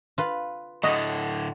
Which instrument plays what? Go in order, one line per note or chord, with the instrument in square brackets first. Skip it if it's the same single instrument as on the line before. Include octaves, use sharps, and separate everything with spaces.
[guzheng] F4 B4
[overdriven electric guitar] A2 D3 [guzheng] F#4 [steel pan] D#5